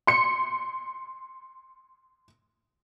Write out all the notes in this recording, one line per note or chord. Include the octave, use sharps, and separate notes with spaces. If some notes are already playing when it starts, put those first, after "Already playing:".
C6 C#7